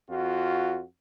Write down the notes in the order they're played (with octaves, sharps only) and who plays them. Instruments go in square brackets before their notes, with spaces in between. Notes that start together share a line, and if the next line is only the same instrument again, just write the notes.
[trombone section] F2 F4 F#4